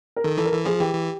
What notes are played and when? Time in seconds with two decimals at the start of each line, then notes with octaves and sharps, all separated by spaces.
0.16 A#4
0.24 D#3 A4
0.38 E3 A4
0.45 A#4
0.52 E3 A4
0.65 F3 G#4
0.80 E3 G4
0.94 E3